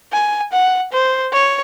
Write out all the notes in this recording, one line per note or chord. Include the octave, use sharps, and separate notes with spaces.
G#5
F#5
C5
C#5